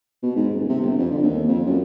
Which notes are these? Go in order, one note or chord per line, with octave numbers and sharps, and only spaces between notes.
B2
G#2
D#1
C3
G1
F2
D3
D#2
F2
F#2